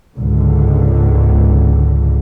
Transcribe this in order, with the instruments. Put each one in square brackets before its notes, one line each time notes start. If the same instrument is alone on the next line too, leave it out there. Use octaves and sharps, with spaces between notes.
[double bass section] C#2 G#2 D3